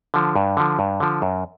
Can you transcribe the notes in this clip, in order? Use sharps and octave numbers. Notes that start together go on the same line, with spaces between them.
D3 F3
G2
D3 F3
G2
D3 F3
F#2